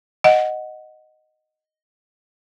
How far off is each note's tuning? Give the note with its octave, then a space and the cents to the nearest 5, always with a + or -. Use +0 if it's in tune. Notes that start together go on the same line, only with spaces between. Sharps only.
D#5 +0 F#5 +0